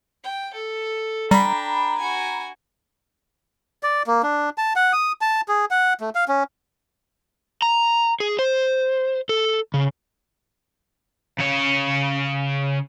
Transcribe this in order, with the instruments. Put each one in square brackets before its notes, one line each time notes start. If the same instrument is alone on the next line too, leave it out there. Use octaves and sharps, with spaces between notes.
[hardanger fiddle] G5
A4
[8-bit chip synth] G3 [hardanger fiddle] D4 G5 [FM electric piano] A#5 B5
[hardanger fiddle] F#4 G#5
[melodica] D5
A#3
D4
A5
F#5
D#6
A5
G#4
F#5
A3
F5
C#4
[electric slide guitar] A#5
G#4
C5
A4
C#3
[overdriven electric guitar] C#3 C#5